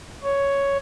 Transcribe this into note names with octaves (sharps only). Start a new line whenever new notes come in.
C#5